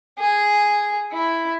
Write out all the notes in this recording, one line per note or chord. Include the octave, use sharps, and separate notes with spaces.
G#4
E4